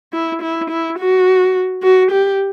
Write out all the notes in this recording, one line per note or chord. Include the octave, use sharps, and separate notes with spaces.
E4
E4
E4
F#4
F#4
G4